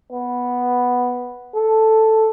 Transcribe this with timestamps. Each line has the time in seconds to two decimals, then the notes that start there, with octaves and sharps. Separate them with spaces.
0.12 B3
1.54 A4